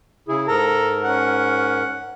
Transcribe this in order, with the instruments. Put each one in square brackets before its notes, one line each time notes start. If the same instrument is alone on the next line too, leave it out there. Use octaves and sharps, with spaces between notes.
[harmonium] C#3 E4 G#4
[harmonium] G#2 A#4 [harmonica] A4 A#5
[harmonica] C#4 F#5